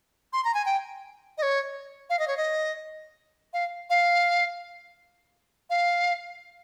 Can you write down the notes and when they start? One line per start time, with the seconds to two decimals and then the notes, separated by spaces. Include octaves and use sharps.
0.33 C6
0.45 A#5
0.54 G#5
0.65 G5
1.38 D#5
1.43 C#5
2.10 F5
2.19 D#5
2.28 C#5
2.37 D#5
3.53 F5
3.90 F5
5.70 F5